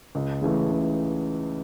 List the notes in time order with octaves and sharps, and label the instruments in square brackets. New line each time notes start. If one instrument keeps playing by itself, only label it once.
[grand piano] C#2
C#3 E3 A3
C#2